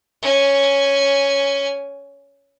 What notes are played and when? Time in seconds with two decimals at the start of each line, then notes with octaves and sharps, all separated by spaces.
0.23 C#4 G#5